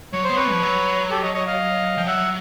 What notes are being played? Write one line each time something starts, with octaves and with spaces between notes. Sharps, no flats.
F#3 C#5
C5
B3
C4 B4 C#5
F3
F#3
G4 A4
C#5 D#5
C#5 D#5
D#5 F5
F3 G5
F#3 E5 F#5